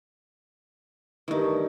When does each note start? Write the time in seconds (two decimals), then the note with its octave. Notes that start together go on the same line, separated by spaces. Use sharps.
1.28 G2 D#3 E3 A3 D#4